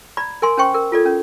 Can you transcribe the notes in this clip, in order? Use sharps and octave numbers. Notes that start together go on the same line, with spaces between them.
D5 A#5 B5
A#4 G#5 C6
C#4 C5 G5 C#6
A#4
F4 A4 D5
C#4